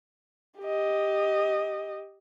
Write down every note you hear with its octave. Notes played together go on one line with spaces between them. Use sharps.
G4 D#5